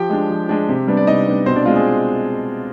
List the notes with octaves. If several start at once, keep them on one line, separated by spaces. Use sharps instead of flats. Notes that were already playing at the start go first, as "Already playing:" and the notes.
Already playing: F3 G4 G5
G#3 D4
F3
G#3 D4
C3
G3 B3 D4
D5
C3 D#4 D#5
G3 B3 D4
B2 C4 C5
D4 D5
G#3 C4 F4
G#3 G#4